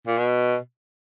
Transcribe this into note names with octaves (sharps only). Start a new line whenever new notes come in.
A#2
B2